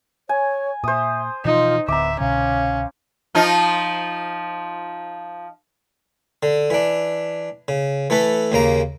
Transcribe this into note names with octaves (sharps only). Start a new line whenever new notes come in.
C#5 G#5
A#2 C5 E5 D#6
B2 E3 F3 D#4 F4
D1 D3 B3 E5 A#5 D6
C2 B2 D3 C#4 F5
F3 D#4 F4
D3
E3 D4
C#3
E3 A3 A4 B4
D#2 C#3 A#3 A#5